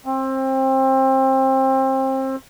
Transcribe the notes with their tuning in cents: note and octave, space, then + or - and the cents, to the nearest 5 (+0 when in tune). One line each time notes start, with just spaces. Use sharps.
C4 +25